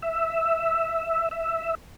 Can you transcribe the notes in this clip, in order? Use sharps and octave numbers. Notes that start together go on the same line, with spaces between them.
E5
E5